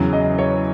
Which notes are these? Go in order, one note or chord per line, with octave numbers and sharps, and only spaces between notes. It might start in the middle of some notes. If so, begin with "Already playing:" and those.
Already playing: E2 C#3 F#3
D#5
C#5